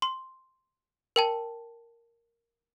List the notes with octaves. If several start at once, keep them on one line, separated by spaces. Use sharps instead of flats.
C6
A#4 G5 A5